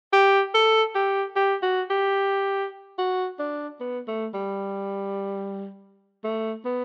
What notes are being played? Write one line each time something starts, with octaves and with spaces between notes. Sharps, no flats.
G4
A4
G4
G4
F#4
G4
F#4
D4
B3
A3
G3
A3
B3